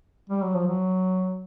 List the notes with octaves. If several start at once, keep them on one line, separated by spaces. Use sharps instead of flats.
G3
F#3
F3
F#3